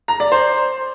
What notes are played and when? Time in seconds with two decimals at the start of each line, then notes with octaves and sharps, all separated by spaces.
0.08 A#5
0.20 D5
0.32 C5